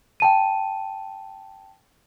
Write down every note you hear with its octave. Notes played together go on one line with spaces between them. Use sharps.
G5 A5 D#7